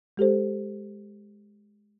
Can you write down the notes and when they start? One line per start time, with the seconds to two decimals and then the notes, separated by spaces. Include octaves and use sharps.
0.17 G#3 G4 A4 C5